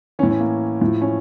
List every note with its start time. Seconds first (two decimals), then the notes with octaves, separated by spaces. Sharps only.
0.19 E3 C#4
0.23 A2
0.29 C#4
0.40 A#3
0.81 A2 F3
1.02 C#4